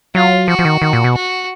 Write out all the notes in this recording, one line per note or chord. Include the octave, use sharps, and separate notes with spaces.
F#3 F4
F3 F#4
F3
D#3
D#3
A#2
B2
F#4